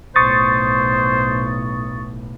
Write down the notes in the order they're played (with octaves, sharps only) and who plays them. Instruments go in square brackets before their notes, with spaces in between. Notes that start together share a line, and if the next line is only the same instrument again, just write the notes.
[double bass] B1 A2 [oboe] C5 [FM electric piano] C#6 D#6 A6